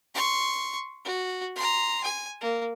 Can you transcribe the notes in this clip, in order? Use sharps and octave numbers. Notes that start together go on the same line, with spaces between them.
C6 C#6
F#4
A#5 C6
G#5
A#3